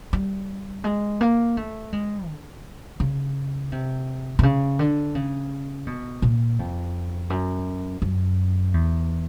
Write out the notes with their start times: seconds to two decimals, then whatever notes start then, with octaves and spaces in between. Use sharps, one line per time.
0.13 G3
0.84 G#3
1.21 A#3
1.57 A3
1.93 G#3
2.28 D3
3.00 C#3
3.72 C3
4.39 C3
4.43 C#3
4.79 D3
5.15 C#3
5.87 B2
6.22 A#2
6.59 F2
7.30 F#2
8.02 F#2
8.74 E2